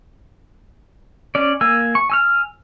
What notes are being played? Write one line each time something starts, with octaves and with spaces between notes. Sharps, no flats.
C#4 D5
A#3 G#5 E6
C#6
G#5 E6 F6